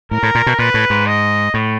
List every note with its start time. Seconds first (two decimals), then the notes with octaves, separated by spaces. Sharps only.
0.11 A2 A#4
0.23 A2
0.35 A#2
0.46 B2
0.59 A#2 B4
0.74 A2
0.90 G#2
1.06 D#5
1.54 A2